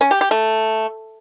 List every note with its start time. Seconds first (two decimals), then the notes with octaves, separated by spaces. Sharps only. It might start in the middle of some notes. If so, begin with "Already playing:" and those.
0.01 C#4
0.11 G4
0.21 G4
0.31 A3